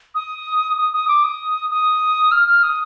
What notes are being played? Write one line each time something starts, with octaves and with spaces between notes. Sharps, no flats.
D#6
D#6
D#6
D6
D#6
D#6
F6
F6
D#6